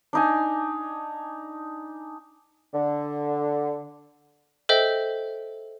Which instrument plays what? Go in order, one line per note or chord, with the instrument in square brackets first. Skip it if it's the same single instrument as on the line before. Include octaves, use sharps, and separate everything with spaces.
[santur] D4 D#4 G#5
[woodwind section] D3
[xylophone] A4 C5 D#5 E5 G5